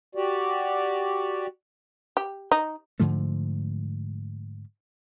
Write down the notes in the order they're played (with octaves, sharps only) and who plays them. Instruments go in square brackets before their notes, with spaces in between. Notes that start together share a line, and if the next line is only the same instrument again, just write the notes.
[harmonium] F#4 G4 D5
[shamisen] G4
D#4
[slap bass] G#2 D3 F3 A3